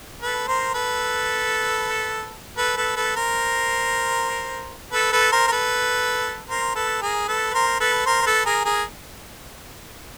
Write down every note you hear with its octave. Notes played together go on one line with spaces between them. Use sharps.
A4 B4
A#4 C5
A4 B4
A4 B4
A4 B4
A4 B4
A#4 C5
A4 B4
A4 B4
A#4 C5
A#4
A4 B4
A#4 C5
A4 B4
G#4 A#4
A4 B4
B4
A#4 C5
A4 B4
A#4 C5
C5
A4 B4
G#4 A#4
G#4 A#4